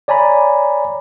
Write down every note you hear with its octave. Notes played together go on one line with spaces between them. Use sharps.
C#5 D5 G#5 A#5 B5